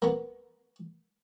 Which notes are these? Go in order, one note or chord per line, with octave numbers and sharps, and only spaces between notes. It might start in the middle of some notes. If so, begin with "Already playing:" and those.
A#3 B3